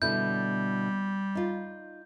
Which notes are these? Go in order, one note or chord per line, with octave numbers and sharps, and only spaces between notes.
B2 D3 G3 E4 G6
D#4 F4